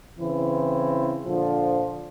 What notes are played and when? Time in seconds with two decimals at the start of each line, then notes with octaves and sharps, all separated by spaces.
0.19 C#3 E3 C4 E4
1.25 A#2 D3 F3